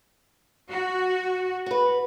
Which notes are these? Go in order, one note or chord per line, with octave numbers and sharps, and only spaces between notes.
F#4
F#4 B4